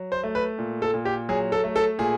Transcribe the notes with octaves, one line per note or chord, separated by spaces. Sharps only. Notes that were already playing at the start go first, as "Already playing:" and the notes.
Already playing: F#3
C5
A3
B4
A#2
A4
A#2
G4
F#3 G#4
A4
A3
A4
A#2 G#4